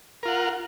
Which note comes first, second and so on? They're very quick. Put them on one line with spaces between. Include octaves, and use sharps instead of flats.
A#4 F4 F#5